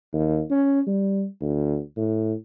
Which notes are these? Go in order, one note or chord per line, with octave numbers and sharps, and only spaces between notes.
D#2
C#4
G3
D2
A2